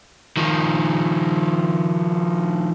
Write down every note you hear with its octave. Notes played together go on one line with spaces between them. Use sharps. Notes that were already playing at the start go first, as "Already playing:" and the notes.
D#3 F3